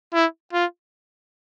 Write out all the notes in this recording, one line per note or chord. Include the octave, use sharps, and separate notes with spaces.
E4
F4